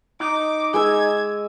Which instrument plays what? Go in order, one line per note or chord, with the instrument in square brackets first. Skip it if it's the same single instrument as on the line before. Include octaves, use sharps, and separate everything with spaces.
[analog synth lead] D#4 [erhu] D6
[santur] G#3 D6 E6 [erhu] G#6